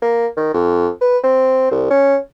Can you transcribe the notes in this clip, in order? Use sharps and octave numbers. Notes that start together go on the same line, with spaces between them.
A#3
D#3
F2
B4
C4
C2
C#4